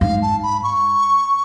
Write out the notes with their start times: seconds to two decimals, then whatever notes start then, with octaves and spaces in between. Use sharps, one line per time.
0.01 G#2 F5
0.22 A5
0.43 B5
0.64 C#6